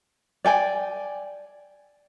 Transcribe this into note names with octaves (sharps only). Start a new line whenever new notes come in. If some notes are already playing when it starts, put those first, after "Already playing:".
D5 G5 G#5